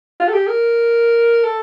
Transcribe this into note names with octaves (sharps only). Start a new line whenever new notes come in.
F4
A4
G4
A#4
A4